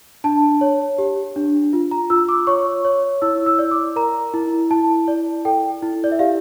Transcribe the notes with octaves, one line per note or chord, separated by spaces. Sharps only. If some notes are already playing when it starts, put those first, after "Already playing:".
D4 A5
C#5
G4
D4
F4
A#5
F4 E6
D6
C#5 C#6
C#5
E4 E6
E6
D5
D6
A#4 A#5
E4
E4 A5
D5
A4 G5
E4
D5
E5
G4 F5